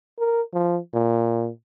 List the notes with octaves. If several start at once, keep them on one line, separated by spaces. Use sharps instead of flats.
A#4
F3
A#2